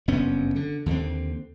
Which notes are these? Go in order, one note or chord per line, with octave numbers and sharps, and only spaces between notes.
F#1 G2 B3 C#4
D3
D#2 D3 G#3 C4